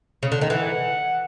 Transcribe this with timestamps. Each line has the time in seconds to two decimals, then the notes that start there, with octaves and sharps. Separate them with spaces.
0.23 C#3
0.32 D3
0.41 D#3
0.50 E3 F#5